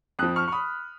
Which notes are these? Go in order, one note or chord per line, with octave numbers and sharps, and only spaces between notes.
F2 F3 D#6 F#6
C#6 F6
C#6
B5 D#6